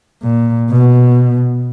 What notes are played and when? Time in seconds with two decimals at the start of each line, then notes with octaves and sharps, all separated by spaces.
0.23 A#2
0.71 B2